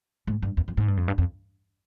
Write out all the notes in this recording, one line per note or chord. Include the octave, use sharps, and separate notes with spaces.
G#2
G2
E2
F2
G#2
G2
F2
G2
F2